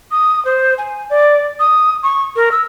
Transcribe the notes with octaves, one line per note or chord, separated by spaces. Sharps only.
D#6
C5
G#5
D5
D#6
C#6
A#4
E6